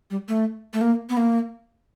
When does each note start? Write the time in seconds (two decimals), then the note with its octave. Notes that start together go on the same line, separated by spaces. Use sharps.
0.11 G3
0.28 A3
0.73 A3
0.81 A#3
1.09 B3
1.17 A#3